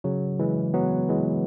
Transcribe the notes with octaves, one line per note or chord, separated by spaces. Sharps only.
C#3 F#3
E3 G#3
F#3 B3
E3 G#3